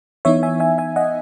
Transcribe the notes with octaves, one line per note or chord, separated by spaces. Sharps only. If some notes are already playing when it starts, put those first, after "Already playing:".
E3 B3 D#4 C#5 E5
E5 G#5
E5 G#5
E5 G#5
D#5 F#5